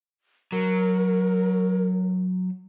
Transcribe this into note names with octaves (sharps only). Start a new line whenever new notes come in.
F#3 A#4